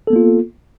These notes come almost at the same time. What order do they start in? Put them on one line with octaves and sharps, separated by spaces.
A4 B3 A#3 F4